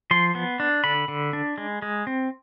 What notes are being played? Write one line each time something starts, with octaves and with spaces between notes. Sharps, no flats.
F3 C6
B3
D4
D3 B5
D3
D4
G#3
G#3
C4